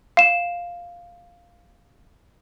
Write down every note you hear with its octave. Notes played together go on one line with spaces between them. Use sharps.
F5 E7